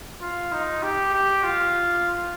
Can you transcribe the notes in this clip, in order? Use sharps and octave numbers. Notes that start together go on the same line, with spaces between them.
F4
D#4
G4
G4
F4